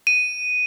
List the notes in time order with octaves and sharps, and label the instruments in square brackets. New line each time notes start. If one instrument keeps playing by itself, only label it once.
[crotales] D#7